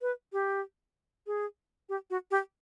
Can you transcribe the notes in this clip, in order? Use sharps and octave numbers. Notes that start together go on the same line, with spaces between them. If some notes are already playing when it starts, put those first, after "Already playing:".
B4
G4
G#4
G4
F#4
G4